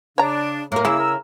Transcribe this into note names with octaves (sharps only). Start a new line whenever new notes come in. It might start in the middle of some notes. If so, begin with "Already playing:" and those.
C#3 D4 C#5 A#5
A2 A#3 A#4
C#3 E4 G#4 E6
A#4